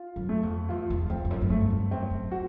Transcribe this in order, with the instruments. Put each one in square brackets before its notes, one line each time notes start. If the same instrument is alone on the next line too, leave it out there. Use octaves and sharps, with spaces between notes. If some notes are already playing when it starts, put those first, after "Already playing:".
Already playing: [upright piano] F4
[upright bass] F#2
[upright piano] A3
[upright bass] F2
[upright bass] E2 [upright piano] F4
[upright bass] E2
[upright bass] F2 [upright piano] C4
[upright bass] F2
F#2
F#2
[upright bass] G2 [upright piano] A3
[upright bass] G2
[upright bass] F#2 [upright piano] C4
[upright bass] F#2
[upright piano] F#4